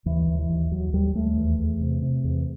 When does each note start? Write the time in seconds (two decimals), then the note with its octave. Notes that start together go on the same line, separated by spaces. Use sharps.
0.06 D#2 E3
0.28 D#2
0.39 E3
0.49 D#2
0.71 D#2 F#3
0.93 D#2 G3
1.14 D#2 A3
1.37 E2
1.59 E2
1.81 C3
2.02 C3
2.24 E2